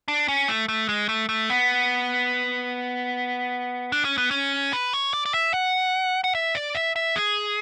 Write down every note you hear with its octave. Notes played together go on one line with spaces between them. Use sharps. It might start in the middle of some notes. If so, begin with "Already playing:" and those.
D4
C#4
A3
A3
G#3
A3
A3
B3
D4
C#4
B3
C#4
B4
C#5
D5
D5
E5
F#5
F#5
E5
D5
E5
E5
G#4